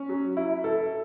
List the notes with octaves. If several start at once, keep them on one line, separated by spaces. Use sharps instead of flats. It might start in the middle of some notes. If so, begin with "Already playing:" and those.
Already playing: C#4
F#3
E4
A4